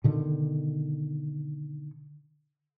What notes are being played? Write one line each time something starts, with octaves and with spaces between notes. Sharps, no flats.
B2 D3 D#3